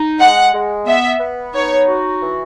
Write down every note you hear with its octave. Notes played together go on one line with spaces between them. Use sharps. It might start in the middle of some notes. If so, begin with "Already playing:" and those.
Already playing: D#4
G#3 F#5
G#3
B3 E5
B3
D#4 C#5
F#4
E3